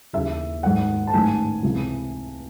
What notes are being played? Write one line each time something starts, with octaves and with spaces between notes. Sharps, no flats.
D#2 C#3 E3 E5
G#1 G#2 D#3 F#5
A5
A1 G#2 D#3 G#5
C#2 C3 E3